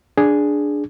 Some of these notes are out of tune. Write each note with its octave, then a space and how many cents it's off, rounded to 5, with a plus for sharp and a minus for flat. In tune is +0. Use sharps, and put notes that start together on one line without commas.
D4 +0 G#4 +0